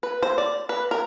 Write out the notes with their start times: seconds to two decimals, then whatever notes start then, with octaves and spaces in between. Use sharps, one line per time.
0.03 B4
0.23 C5
0.38 D5
0.69 B4
0.91 A#4